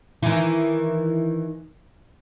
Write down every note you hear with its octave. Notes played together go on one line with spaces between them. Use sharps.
D#3 E3